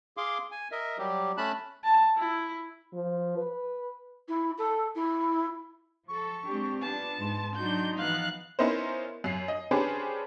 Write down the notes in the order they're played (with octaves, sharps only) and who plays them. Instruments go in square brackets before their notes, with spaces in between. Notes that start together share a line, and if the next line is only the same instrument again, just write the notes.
[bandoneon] G#4 F5 C6 D6
G#5
A#4 D#5 E5
F#3 G3 G4
A3 C#4 A5 B5 F#6
[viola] A5
E4
[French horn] F3
B4
[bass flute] E4
A4
E4
[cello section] F3 A4 [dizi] C#6
[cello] G#3 G4 [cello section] C4 D4
[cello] B3 [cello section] D4 F4 [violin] A5
[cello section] G#2 [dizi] C6
[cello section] F#3 D4 F#4 [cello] D#4 [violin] G6
[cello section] E3 F3 B3 [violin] F5 F#6
[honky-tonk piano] B3 C#4 D#4 E4 A#4 C5
F#2 C7
D#5
C#4 D4 G4 G#4 B4 C5